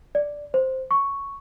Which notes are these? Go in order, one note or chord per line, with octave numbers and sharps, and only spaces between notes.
D5
C5
C#6